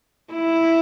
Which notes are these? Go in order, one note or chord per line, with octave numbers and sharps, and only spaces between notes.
E4